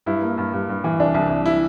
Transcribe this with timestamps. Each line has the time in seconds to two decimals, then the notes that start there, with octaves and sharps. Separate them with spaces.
0.06 G2 E4
0.22 A#3
0.38 G2
0.53 G2
0.69 G2
0.84 E3
1.00 C2 D4
1.14 C2
1.30 C2
1.46 E4